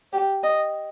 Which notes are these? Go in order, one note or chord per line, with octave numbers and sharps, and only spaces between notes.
G4
D#5